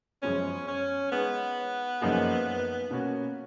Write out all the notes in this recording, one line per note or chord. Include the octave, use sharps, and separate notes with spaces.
F#2 F3 G#3 B3 C#4
C#4
G#3 B3 D#4 G#4 C#5
F#2 F3 A#3 D#4 G#4
B2 A#3 C#4 F#4